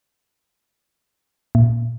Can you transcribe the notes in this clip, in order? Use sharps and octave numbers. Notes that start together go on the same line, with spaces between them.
A#2